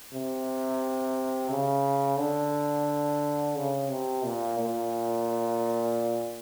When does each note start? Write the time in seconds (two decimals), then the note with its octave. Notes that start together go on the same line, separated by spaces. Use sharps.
0.13 C3
1.50 C#3
2.19 D3
3.56 C#3
3.90 C3
4.25 A#2
4.59 A#2